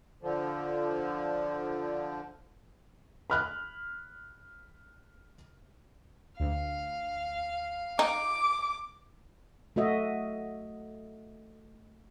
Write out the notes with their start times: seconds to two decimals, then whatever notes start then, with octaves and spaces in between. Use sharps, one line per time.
0.22 D3 F3
3.30 B5 F6 F#6
6.40 D2 F5
7.99 D#4 D6
9.76 A3 F#4 D#5 E5